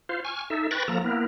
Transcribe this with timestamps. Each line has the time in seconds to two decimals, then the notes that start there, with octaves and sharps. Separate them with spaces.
0.09 F4 C5 F5
0.25 G#5 C#6 F6
0.50 D#4 A4 E5
0.71 B4 G5 B5 C#6 A6 A#6
0.88 F3 A#3 A4 A#5
1.04 A#3 B3 E4 A#4